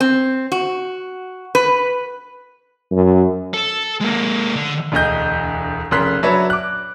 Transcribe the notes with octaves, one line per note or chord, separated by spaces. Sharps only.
C4
F#4
B4
F#2
A4
G#3 A#3
D3
E1 D2 D#5 G6
F1 C#3 A#4 C6 F#6 B6
F#3 D4 B4 C#5 E5
D6 F#6